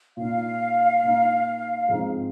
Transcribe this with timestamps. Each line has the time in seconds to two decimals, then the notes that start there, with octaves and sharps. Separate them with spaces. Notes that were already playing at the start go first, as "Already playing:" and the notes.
0.17 A#2 A#3 D#4 F5
1.03 A#2 A#3 D#4
1.89 G#2 F3 G#3 C4 D#4